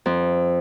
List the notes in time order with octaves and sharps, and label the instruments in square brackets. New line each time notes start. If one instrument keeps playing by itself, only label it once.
[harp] F2